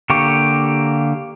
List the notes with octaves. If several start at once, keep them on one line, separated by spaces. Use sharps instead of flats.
D3 A#3 G4 C#6